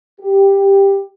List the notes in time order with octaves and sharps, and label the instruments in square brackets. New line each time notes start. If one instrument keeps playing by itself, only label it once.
[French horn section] G4